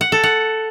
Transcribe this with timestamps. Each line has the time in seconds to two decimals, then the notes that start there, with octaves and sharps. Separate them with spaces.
0.01 F#5
0.12 A4
0.23 F#5